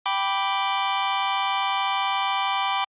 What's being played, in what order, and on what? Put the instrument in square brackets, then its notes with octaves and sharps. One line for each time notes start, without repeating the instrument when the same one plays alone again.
[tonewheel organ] G5 B5 D6